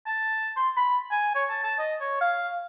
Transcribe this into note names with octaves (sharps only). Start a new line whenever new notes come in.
A5
C6
B5
G#5
C#5
A5
A5
D#5
C#5
F5